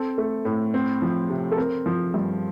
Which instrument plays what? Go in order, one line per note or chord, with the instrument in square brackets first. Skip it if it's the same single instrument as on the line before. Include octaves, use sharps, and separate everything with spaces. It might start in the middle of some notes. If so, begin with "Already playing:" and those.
Already playing: [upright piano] C4 A4
A3
A2
C4
F3
C3
A4
C4 A#4
F3
G2